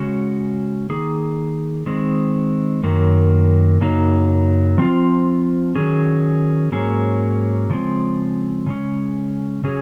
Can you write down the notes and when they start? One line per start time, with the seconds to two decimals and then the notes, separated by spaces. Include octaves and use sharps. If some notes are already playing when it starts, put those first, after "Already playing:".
Already playing: C#3 G#3 C#4 F#4
0.90 D#3 A#3 D#4 G#4
1.86 D#3 G#3 C4
2.83 F#2 D#3 F#3 A#3
3.80 F#2 C#3 F#3 A#3 D#4
4.78 F3 C4 F4
5.75 D#3 F#3 C#4 G#4
6.72 G#2 F#3 A#3 C#4 G#4
7.70 C#3 F3 G#3 C4
8.66 C#3 G#3 C#4
9.64 C#3 F#3 C#4 G#4